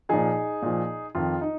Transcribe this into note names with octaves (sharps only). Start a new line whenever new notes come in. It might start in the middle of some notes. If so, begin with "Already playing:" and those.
A#2 F3 D#4 G#4
A#2 F3
F2 D#3 F4
D#4